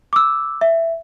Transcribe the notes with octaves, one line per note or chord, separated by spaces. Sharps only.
D6 E6
E5